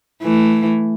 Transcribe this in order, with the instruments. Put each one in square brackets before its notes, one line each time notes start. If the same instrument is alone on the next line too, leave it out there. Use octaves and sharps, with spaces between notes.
[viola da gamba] E3 A3